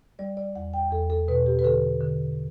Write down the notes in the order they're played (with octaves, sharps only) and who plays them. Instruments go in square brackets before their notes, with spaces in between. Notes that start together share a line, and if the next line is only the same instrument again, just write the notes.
[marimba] G3 D5
D5
E2 F#5
G5
E2 A4
A4
B2 B4
G4
B4
D3 A4
D3